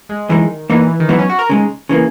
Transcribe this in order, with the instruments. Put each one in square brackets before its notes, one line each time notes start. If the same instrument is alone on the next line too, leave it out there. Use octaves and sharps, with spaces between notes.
[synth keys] G#3
[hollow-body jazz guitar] F#2 E3 G#3 D#4 [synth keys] D#3
[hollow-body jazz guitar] A#2 A#3 D#4 [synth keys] E3
[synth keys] D#3
[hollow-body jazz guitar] G#2 F#3 B3 D#4 [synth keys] E3
[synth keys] C#4
F#4
A#4
[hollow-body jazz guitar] C#3 G#3 D#4
C#3 E3 A#3